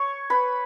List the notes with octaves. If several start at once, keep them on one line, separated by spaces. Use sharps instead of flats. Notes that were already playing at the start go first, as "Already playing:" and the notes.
Already playing: C#5 C#6
B4 B5